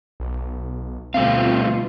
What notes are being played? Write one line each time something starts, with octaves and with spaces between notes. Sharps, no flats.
B1
D2 B2 G3 A3 C4 F4 F5